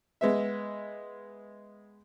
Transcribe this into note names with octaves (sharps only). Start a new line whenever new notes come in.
G#3 B3 E5